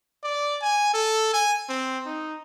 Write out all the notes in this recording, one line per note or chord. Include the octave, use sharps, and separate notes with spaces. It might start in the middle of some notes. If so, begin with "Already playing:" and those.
D5
G#5
A4
G#5
C4
D#4